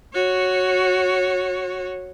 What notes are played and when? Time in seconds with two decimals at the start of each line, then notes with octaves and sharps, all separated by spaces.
0.13 F#4 C#5